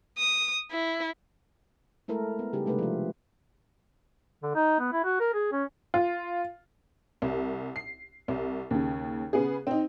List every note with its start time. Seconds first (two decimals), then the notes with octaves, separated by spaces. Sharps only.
0.18 D#6
0.72 E4
2.08 G#3 A3 E4 A4 A#4
2.39 B3
2.53 C#3 G3 D#4 G4 G#4
2.66 C3 G#3 A3 D4 D#4 B4
2.79 F3 F4
4.43 D3
4.55 D#4
4.80 B3
4.92 E4
5.05 F#4
5.20 A#4
5.34 G#4
5.52 C#4
5.94 F4
7.22 C2
7.76 C7
8.28 C2
8.71 D#2 C#3
9.33 C#3 B3 G#4
9.67 C4 D#4